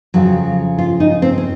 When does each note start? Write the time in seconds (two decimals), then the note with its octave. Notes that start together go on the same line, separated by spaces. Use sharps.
0.14 F2 C#3 F#3
0.78 F4
1.00 D#4
1.22 C4
1.38 C#4